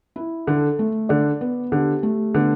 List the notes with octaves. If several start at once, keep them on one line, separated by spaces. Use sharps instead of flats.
E4
D3 A4
A3
D3 D5
B3
D3 G4
A3
D3 B3